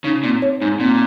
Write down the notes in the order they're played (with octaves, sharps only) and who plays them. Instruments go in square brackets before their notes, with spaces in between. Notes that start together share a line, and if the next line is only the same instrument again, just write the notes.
[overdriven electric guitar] C#3 [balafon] D#4
[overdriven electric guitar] A#2 [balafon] C4
[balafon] C#5
[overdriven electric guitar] G#2 [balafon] D#4
[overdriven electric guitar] A#2 [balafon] C4